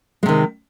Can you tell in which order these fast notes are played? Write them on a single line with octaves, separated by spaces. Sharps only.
G#3 C3 D#3